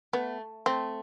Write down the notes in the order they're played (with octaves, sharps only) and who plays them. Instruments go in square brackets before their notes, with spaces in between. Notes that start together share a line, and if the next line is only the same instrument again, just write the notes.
[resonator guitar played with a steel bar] A3 [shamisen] B3
[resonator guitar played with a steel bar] A3 [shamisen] C4